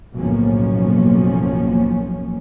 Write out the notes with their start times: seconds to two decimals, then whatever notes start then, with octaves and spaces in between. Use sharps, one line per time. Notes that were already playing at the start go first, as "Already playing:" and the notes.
0.15 F#1 B1 A2 F3 A#3 C#4